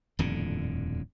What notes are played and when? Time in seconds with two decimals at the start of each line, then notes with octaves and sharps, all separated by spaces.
0.19 D#1 F2 A2 D3